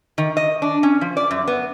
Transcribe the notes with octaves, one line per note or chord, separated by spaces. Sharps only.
D#3
D#5
D4
C#4
F3
D5
F#2
B3